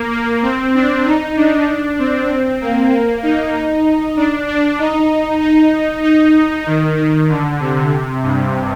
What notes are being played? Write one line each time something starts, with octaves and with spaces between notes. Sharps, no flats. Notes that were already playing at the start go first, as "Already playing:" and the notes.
Already playing: A#3
A#3
C4
D4
D#4
D4
C4
A#3
A#3
D#4
D4
D4
D#4
D#4
D#4
D#3
D#3
D3
C3
G2